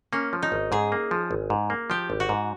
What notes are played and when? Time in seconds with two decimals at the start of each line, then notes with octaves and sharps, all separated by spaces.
0.13 A#3 C#4
0.33 F3
0.42 D#4
0.52 G#1
0.72 G#2 G#4
0.92 A#3
1.11 F3
1.31 G#1
1.50 G#2
1.70 A#3
1.90 F3 G4
2.10 G#1
2.20 F#4
2.29 G#2